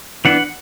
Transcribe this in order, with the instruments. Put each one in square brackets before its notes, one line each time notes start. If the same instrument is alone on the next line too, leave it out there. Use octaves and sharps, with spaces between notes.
[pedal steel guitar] E3 B3 D4 F#5